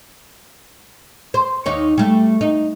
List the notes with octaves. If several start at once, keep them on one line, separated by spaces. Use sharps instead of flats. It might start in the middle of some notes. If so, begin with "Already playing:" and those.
C5
D#2 D#4 C#5
G3 A3
D#4